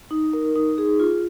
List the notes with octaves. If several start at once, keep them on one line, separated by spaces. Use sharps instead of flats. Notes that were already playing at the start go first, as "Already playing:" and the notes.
D#4
A#4
D#4
G#4
F4